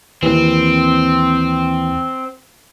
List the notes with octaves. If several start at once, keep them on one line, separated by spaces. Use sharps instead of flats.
D#2 E3 C4